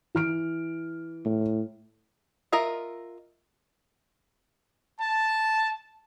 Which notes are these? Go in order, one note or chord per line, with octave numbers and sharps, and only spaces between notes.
E3 F6 D7
A2
F4 A#4 D#5 E5
A5